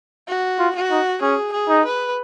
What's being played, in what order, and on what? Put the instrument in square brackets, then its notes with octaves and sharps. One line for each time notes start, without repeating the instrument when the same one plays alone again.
[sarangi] F#4
[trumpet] F4
[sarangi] F#4
[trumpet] D#4
[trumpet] C#4 [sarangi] G#4
[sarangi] G#4
[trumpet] D#4
[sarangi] B4